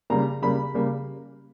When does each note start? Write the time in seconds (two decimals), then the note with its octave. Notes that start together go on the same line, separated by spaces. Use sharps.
0.10 C#3 G3 A#3 A#5
0.42 C#3 G3 A#3 B5
0.74 C#3 G3 A#3